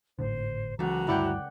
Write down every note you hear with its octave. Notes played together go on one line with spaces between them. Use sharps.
G#1 A2 D3 C5
C#2 E3 F#3 F#4 A4 A#5
D2 G2 G3 E4 D5 F#5 G5